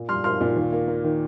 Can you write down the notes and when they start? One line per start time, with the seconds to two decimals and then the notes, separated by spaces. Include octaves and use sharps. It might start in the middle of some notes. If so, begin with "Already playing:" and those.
Already playing: A#2
0.09 G3 C6 F6
0.24 A#3 C6 F6
0.41 A#2
0.56 D#2
0.72 A#3
0.88 A#3
1.04 D#3